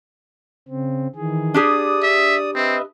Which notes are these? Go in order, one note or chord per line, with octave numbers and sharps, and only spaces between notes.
C#3 C4
D#3 E3 G#4
D4 G4 G#4 D5 D#6
E5
C4 B4 D#5 E5